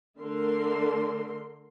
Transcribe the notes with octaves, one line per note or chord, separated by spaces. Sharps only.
D3 A3 A#4 C6